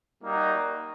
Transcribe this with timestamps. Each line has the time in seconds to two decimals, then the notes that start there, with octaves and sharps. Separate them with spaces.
0.22 G3 A#3 D#4 F#4